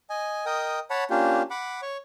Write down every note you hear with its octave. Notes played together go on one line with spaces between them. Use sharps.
D#5 G#5
A#4 D#5 G5 D#6
C#5 F#5 A5 B5
A#3 C#4 D4 F4 G4
F#5 B5 D6
C#5 C#6